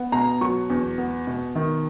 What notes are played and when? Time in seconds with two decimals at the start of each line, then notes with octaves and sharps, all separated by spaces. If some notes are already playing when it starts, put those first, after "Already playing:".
Already playing: B3
0.12 B2 A#5
0.41 F#3 C#6
0.70 E2
0.98 B3
1.27 B2
1.55 D#3